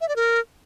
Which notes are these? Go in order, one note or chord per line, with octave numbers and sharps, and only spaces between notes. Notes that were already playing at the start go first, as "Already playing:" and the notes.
E5
D5
A#4